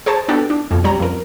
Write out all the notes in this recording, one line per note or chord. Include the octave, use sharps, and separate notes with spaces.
G#4 C5 C#5 A5
B3 D4 F#4 G4 A4
D4
F2 B2
B1 G3 C#4 A#5
F2 A#4